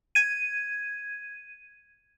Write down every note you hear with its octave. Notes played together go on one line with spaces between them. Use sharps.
G#6 D#7